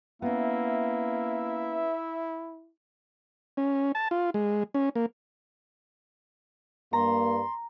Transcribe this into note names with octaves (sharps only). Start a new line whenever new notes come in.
A#3 B3 C#4 E4 E5
C#4
A5
F4
G#3
C#4
A#3
G2 A#3 A#5 C6